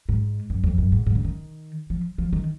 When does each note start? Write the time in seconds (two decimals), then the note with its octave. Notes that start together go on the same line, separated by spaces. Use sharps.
0.09 G#2
0.50 F#2
0.64 F2
0.78 F#2
0.92 G#2
1.06 G#2
1.15 C#3
1.25 D#3
1.90 F3
2.18 F3
2.33 D#3